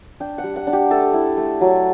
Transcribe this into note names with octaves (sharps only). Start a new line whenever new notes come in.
D4 G5
F#5
G3
F#5
D4
G4
A3 A4
E4
A3
F#3